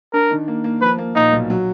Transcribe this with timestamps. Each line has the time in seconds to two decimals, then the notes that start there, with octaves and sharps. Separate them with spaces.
0.13 D4 A#4
0.31 D#3
0.48 A#3
0.64 A#3
0.81 F3 B4
0.98 A#3
1.15 A#2 D#4
1.32 B1
1.50 F#3